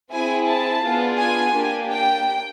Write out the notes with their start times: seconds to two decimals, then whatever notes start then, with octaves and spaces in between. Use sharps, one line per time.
0.12 C4 E4 G#4 G#5
0.48 A5
0.84 B3 D4 F4 G#4
1.20 G#5
1.56 A#3 D4 G4
1.92 G5